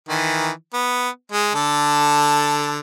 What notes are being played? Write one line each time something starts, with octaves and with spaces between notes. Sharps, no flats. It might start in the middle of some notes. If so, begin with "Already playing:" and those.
D#3 E3
B3
G#3
D3 A4 A5